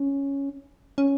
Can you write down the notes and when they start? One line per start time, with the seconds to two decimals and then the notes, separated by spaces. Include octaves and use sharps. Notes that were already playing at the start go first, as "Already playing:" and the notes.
Already playing: C#4
0.98 C#4